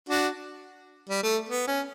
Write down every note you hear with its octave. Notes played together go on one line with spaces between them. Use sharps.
D4 F#4
G3
A3
B3
C#4